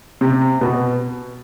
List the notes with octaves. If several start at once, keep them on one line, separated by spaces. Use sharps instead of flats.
C3
B2